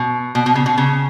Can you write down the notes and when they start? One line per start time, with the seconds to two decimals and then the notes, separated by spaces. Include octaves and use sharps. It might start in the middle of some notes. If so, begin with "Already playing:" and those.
Already playing: B2
0.35 B2
0.46 B2
0.55 C#3
0.66 B2
0.78 C#3